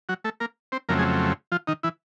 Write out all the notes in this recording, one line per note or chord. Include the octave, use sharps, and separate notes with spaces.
F#3 F#4
A3 A4
A#3 A#4
C4 C5
F2 C#3 F#3 A3 A#3 C4 A#4
G#3 G#4
F3 F4
D#3 D#4
E3 E4